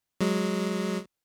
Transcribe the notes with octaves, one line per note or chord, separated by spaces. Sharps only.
F#3 G#3